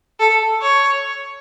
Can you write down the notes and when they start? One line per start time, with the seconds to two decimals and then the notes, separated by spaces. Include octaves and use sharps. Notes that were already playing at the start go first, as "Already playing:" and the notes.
0.20 A4
0.62 C#5